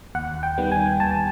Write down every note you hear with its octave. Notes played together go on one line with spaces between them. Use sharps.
D#2 F#5
G5
D#3 G3 B3
G#5
D#2 A5